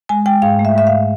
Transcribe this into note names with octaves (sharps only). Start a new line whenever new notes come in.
G#3 G#5
G#3 G5
G#2 F5
A3
E5
G#2 E5
F5